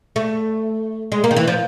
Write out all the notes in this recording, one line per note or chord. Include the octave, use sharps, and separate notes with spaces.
A3
G#3
A#3
D#3
E3
F3